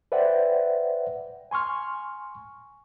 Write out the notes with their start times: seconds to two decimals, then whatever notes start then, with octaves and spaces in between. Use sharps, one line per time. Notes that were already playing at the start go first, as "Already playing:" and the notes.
0.12 B4 C5 D5 E5 F#5 G5
1.51 G#5 C6 C#6 F6